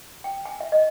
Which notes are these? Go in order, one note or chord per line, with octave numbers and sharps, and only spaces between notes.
G5
G#5
E5
D#5